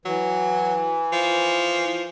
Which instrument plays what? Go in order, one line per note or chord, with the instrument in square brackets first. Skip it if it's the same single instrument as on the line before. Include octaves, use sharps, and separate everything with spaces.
[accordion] E3 [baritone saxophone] F#3
[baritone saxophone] F3